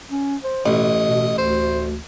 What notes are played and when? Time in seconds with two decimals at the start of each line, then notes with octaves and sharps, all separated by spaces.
0.10 C#4
0.44 C5
0.66 A1 B2 D#5
1.03 B2
1.38 D2 C5